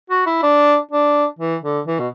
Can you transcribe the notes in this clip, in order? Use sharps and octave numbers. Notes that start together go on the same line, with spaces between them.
F#4
E4
D4
D4
E3
D3
E3
B2